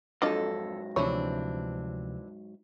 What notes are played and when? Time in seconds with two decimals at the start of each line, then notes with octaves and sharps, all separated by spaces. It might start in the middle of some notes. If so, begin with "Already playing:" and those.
0.22 F2 G#2 F#3 D4 F4 A4 D#5 A#6
0.96 D2 C3 E3 F3 C4 D4 C#5